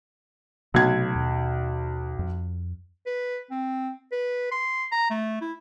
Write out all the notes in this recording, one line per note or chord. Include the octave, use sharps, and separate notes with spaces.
B1 C3 F#3 A3 G#6
D#2 B2
F2
B4
C4
B4
C6
A#5
A3
E4